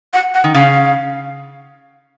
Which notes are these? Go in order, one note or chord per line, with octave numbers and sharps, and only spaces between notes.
F#5
F#5
D#3
C#3 F5